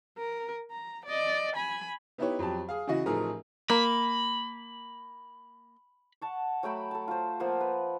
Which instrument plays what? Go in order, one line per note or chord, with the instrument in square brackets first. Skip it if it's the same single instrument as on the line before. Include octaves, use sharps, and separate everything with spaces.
[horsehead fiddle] A#4
A#5
D5 D#5
G#5 B5
[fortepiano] B3 D#4 E4 G4 B4 C#5
F2 F#3 G4 A5
G#4 F5
C#3 E3 E4 F#4 D#5
A1 F3 A3 D#4 G#4 A#4
[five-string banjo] A#3 [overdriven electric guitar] B5
[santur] F#5 A5 C#6
F#3 A3 G5 B5
A4 A5
F4 C5
F3 A#3 C5 F#5
B4